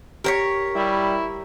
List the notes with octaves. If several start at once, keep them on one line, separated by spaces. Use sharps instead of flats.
G4 A#4 C5 C#5 B6
G3 E4